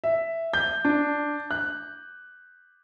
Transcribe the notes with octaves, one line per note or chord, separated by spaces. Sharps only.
E5
G6
D4
F#6